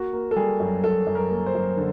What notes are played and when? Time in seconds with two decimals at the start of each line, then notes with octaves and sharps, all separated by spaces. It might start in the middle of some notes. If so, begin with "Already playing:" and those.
Already playing: A#3 F#4
0.13 A#3
0.31 A4
0.36 G3 G#4
0.60 F#2
0.84 F#2 A4
1.07 F#2
1.15 A#4
1.31 A#3
1.46 C5
1.55 F#2
1.77 D3